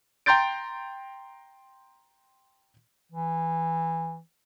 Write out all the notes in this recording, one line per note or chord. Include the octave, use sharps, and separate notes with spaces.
G5 A#5 C6 G6 A6 D7
E3